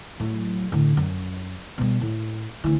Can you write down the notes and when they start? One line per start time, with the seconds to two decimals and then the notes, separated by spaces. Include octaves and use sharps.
0.20 A2 F#3
0.72 A2 D3
0.97 F#2
1.78 B2 G3
2.01 A2
2.64 D2 E3